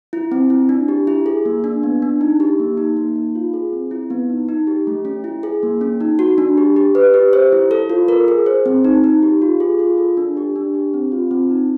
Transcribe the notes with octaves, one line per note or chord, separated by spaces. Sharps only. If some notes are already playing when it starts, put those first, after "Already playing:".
E4
C4
E4
D4
G4
E4
G#4
A#3
D4
B3
D4
D#4
G4
A#3
D#4
A#3
D#4
F4
G#4
C4
E4
B3
D#4
D#4
G4
A3
C#4
E4
G#4
A#3
C#4
D#4
F#4
D4
G4
G4
B4
G4
C5
E4
A4
F4
A#4
G#4
C5
C4
D#4
D#4
G4
F4
G#4
F4
A4
D4
G4
D4
G4
C4
F4
C4
D#4